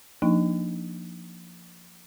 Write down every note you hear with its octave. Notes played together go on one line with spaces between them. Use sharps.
F3 A#3 D4 D#4